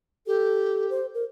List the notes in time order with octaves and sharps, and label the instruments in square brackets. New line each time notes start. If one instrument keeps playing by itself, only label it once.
[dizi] G4 [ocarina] A4
[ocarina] C5
A#4